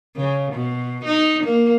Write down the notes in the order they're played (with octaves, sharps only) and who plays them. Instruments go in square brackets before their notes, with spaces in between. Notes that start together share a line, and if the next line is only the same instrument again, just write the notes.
[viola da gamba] C#3
B2
D#4
A#3